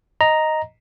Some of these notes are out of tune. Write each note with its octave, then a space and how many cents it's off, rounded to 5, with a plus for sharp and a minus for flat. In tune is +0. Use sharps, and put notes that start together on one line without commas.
D#5 +0 A#5 +0